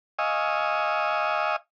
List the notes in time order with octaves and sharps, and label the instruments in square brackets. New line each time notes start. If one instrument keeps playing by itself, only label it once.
[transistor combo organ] D#5 F5 G#5 C#6 D#6 E6